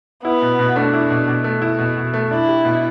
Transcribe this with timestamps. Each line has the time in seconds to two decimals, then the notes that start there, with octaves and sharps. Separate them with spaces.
0.24 B3 E4
0.42 B2
0.59 B2
0.76 A3 D4
0.94 E4
1.10 B2
1.27 B2
1.44 A3
1.62 E4
1.79 B2
1.96 B2
2.14 A3
2.30 D4 E4
2.48 G4
2.65 B2